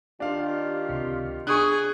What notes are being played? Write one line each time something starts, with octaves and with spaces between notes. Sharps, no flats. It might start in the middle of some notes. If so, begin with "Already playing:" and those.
D#3 D4 F4 G4 F5
C#2 C3
D4 G#4 C#6 D#6 F#6